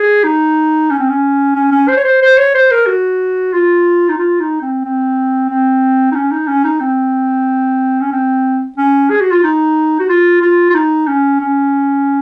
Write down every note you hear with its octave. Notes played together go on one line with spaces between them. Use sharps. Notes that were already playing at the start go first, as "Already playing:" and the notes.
Already playing: G#4
D#4
C#4
C4
C#4
C#4
C#4
C5
C#5
C5
C5
C#5
C5
A#4
F#4
F4
D#4
F4
D#4
C4
C4
C4
D#4
C#4
D#4
C#4
D#4
C4
C#4
C4
C#4
G#4
F#4
F4
D#4
F#4
F4
F4
F4
D#4
C#4
C#4